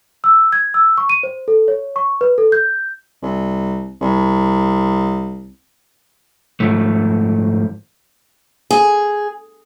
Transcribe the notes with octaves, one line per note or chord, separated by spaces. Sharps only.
E6
G#6
E6
C#6
D#7
C5
A4
C#5
C#6
B4
A4
G6
C2
C2
G#2 D#3 F3 A3
G#4